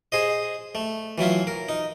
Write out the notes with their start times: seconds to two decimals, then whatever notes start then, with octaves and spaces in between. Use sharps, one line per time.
0.12 G#4 C5 D#5
0.75 A3
1.18 E3 F#3 E4 F4
1.47 A#4
1.69 D#4